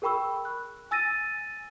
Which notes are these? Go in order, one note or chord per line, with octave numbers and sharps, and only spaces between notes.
G#4 A#4 G5 B5 C#6 E6
F#6
G#5 E6 A6 A#6 D#7